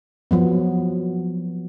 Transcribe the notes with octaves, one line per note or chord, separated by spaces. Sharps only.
F3 F#3 B3